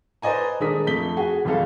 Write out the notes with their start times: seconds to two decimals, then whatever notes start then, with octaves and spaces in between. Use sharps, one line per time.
0.22 B4 C5 D5 D#5 G#5 A#5
0.60 D#1 G#3 D4 A#4 D#6 B6
0.87 F2 A3 B6 G7
1.17 F#4 G#4 G#5
1.45 G1 F2 G#3 G#4 A4 F5